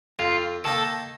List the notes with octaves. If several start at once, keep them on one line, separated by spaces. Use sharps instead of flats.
F2 F4
D#3 A#3 D#4 A4